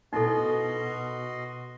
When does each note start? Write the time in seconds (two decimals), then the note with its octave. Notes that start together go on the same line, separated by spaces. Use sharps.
0.13 B2 D#4 E4 F#4 A4 D#5 C6